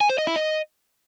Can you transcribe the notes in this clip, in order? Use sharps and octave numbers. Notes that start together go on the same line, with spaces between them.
G#5
C5
D#5
E4
D#5